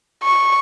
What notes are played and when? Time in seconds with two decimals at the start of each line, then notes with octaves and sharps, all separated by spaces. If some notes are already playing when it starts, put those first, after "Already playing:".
0.23 C#6